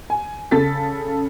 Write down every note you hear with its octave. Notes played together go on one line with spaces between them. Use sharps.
G#5
C#3 A4 A6 B6